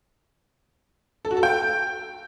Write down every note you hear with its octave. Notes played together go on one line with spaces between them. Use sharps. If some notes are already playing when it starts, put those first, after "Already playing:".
A4
F#4
A4
G5